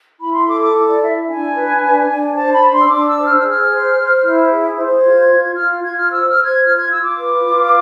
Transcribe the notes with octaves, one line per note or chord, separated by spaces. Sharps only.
E4 B5
C6
A4 D6
D6
E4
D5
E4 E5
D4 G#5
B4
D4
D4
C5 A5
B5
D4
C6
E6
D4 D6
E6
C5
F6
E6
G#4
F6
C5
C5
E4
G#4
C5
F4 G#6
F4
F4 F6
F4 G#6
F6
C5 E6
F6
C5
G#6
F4 F6
G#6
F4 E6
D6
B4
F4